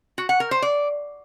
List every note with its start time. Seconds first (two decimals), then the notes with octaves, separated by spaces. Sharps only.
0.18 F#4
0.29 F#5
0.40 A#4
0.51 C5
0.62 D5